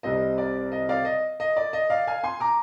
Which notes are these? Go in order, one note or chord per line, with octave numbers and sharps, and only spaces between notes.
C2 C3 G3 C4 D#5
D5
D#5
D5 F5
D#5
D#5
D5
D#5
D5 F5
F5 G#5
G#5 C6
A#5 D6